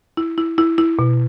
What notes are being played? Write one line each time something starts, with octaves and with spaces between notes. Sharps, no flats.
E4
E4
E4
E4
B2